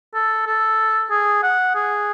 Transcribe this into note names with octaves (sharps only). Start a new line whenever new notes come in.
A4
A4
G#4
F#5
G#4